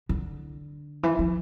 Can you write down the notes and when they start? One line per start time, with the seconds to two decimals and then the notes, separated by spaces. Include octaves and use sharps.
0.09 D3
1.03 E3
1.19 F3